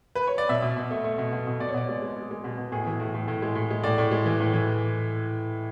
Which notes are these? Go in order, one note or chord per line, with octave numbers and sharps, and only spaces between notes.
B4
C#5
D5
B2 E5
B2
B2
A3
A3
B2
B2
B2
B2 D5
C#5
B2 D5
G#3
G#3
G#3
G#3
B2
B2
A2 G#4
E3
A2
A2
A2
G#3
A2
G#3
A2 D5
A2
G#3
E3
A2
E3